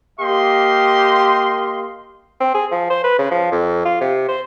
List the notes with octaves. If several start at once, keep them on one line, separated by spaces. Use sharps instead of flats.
A#3 G4 D#5 F5 C6
C4
G#4
F3
C5
B4
C#3
F3
F2
F4
C3
C5